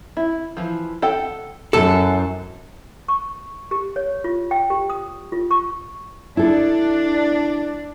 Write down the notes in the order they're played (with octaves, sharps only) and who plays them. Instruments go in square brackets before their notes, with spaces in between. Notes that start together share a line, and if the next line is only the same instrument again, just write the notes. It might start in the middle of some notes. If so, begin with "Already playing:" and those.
[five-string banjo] E4
E3 F3
A4 F#5 G5
[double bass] F#2 [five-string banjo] E3 [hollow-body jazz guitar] A4
[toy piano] C#6
G4
C#5
F4
G5
G4
D#6
F4
C#6
[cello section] D4 [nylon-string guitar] E4 A4